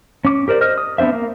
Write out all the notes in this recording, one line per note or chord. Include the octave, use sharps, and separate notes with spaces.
C#4 D6
G4 A#4 C5 D5
C5 D#5 F6
D#6
B3 C4 D4 C5 E5
A#3